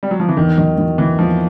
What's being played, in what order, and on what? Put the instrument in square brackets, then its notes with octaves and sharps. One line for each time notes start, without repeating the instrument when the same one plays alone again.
[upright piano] G3
F#3
F3
E3
[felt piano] E2 [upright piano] D#3
[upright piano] D#3 [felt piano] F#3
[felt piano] F#3
[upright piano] E3 [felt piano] A#3
[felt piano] E2 [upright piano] F3